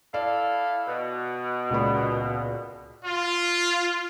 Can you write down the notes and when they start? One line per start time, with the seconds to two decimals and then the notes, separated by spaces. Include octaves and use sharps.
0.14 E4 A4 D5 F5
0.87 B2
1.70 C#2 A#2 B5
3.06 F4